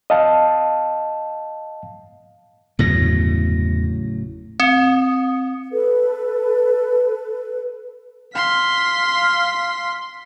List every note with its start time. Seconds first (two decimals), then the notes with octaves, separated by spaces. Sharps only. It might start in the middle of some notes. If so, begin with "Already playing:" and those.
0.10 D#5 F5 A5
2.79 G1 E2 A2 C#3 F#3 A#6
4.60 C4
5.72 A4 B4
8.35 F5 C6 B6